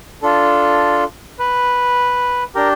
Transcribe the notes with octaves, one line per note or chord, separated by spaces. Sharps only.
D4 F4 A4
B4
D4 G4 A#4